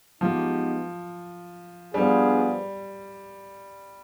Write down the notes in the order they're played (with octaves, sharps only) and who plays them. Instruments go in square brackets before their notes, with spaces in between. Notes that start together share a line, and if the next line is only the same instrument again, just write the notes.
[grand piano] F3 [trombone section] G#3 B3 D#4 G4
[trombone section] F3 B3 D4 G#4 [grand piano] G3